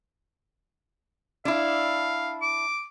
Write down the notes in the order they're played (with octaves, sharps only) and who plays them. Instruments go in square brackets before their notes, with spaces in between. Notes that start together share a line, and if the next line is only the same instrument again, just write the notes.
[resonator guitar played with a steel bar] D4 E4 [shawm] F5
[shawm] D6